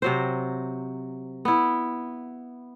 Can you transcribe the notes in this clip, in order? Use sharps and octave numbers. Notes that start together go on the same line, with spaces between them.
C3 F#3 C5
B3 E4